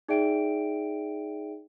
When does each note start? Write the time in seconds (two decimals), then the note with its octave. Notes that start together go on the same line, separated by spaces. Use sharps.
0.08 D#4 G#4 D5 E5 G5 D7